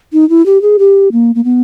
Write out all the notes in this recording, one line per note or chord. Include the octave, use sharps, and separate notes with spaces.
D#4
E4
G4
G#4
G4
A#3
A#3
B3